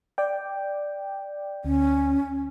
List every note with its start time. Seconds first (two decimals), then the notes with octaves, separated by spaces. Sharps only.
0.18 D5 G5
1.65 D2 C#4